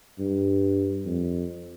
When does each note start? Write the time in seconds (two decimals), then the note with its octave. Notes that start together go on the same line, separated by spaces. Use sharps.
0.19 G2
1.06 F2